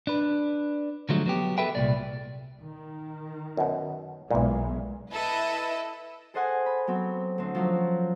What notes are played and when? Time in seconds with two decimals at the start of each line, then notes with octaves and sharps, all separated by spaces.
0.07 D4 B4
1.09 D3 F3 F#3 G#3 A3
1.26 F#3 B3 G4
1.58 G#4 A4 B4 E5 G5
1.75 C2 A#2 D5
2.60 D#3
3.57 F#2 B2
4.31 B1 A#2 E3 G#3
5.12 E4 A4 B4 D#5 E5
6.34 G#4 A4 C5 D#5 F#5 G#5
6.66 B5
6.87 F#3 B3 C4
7.38 D2 C4
7.55 F3 F#3 C#4